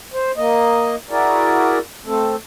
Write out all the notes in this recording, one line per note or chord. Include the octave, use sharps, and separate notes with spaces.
C5
A#3 D#5
E4 F#4 G#4 A#4 D5
A3 C4 A4